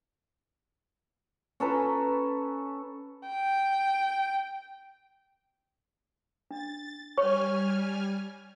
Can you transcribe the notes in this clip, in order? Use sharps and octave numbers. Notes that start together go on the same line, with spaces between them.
C#4 A4 B4 A#5
G5
D4 A6
G3 C#5 G#5 C#6 F6